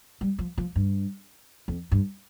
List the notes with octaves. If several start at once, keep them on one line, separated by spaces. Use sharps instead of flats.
G3
F3
F3
G2
F2
G2